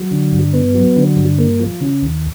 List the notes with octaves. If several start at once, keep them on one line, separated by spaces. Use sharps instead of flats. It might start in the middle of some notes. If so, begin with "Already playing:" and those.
Already playing: F#3
D3
G2
B3
F#3
D3
G2
A#3
F3
C#3
D#2